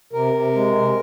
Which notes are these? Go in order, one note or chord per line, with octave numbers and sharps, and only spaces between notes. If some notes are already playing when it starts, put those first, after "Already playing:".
C3 A#4
C3
G#3
C3